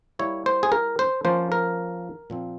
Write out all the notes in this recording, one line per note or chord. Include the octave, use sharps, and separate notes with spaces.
G3 A#3 E4 C#5
C5
G#4
A#4
C5
F3 A#3 C#4 F4 C5
A#4
A#2 F3 C4